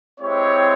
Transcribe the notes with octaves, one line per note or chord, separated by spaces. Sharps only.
G#3 C4 E4 G4 C#5